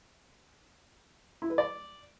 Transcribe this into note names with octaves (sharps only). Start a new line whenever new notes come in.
E4
B4
D5